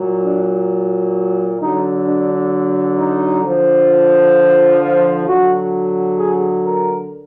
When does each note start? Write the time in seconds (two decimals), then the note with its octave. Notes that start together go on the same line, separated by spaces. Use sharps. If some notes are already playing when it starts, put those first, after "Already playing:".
Already playing: A#2 F#3
0.23 D4
1.60 D3 F#3 D#4
2.06 D4
2.98 D#4
3.43 D3 F3
4.35 F4
4.81 F4
5.27 D3 F#3 F#4
6.17 G#4
6.63 A#4